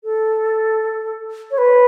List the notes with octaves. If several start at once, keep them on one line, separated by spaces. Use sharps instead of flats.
A4
C#5
B4